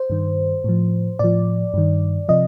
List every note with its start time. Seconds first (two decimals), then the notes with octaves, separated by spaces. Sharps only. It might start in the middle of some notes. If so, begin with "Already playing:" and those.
Already playing: C5
0.10 G2 D#3
0.64 A2 F3
1.19 A2 F3 D5
1.74 G2 D#3
2.29 C3 F3 D#5